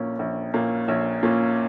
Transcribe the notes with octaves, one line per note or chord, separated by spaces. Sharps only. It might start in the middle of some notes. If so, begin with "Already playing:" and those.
Already playing: A#1 A#2 A#3 C#4
A#1
A#2 A#3 C#4
A#1 C#5
A#2 A#3 C#4